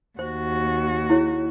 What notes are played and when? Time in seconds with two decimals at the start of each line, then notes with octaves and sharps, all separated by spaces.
0.19 D#2 F#4 C5
1.10 E4 G#4 C#5